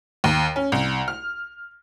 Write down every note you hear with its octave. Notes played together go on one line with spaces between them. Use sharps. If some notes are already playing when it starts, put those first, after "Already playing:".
D#2
C#4
C2
F6